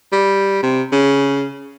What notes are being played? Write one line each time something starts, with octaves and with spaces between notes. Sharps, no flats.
G3
C3
C#3